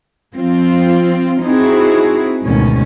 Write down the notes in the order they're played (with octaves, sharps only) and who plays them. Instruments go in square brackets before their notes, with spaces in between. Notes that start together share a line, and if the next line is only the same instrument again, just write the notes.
[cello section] F3 C4 F4
C4 D#4 E4 F#4 G#4
D2 G#2 B2 D#3 C#4